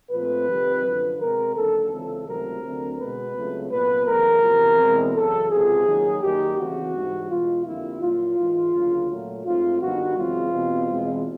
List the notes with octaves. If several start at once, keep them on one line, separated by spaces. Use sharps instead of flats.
A#2 F3 A3 C4 B4
F2 C3 D#3 G3
F#2 D3 F3
B2 G#3 C4 A#4
D#2 D3 F#3 A#3 A4
C#2 C#3 E3 G#3 C4 A4
C#2 C3 D#3 F#3 A3 A#4
D2 D3 F#3 A3 C4
B2 G#3 B3 B4
C#2 C#3 F#3 A3 C4
C2 A#2 F#3 B3 B4
E2 C#3 F#3 A3 A#4
E2 C3 F3
E2 B2 G#3 C4
F#2 C#3 E3 A4
C#2 C3 F3 G#4
D#2 D#3 F#3 A#3
F#2 D#3 G3 A#3 G4
E2 C#3 E3 A3 C4 F#4
G#2 E3 G3
E2 B2 G#3 F4
F2 D3 G3 A#3 E4
A#2 F#3 A#3 F4
G#2 E3 G#3
D2 C#3 F#3 A#3
A#2 F#3 A3
G#2 F3 A3 C4 F4
G2 D#3 G3 B3 F#4
F#2 C#3 E3 G#3 C4 F4
E2 B2 G3 C4
E2 B2 G#3 C4